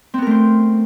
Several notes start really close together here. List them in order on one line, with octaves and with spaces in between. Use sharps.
C4 B3 A#4 A3 C5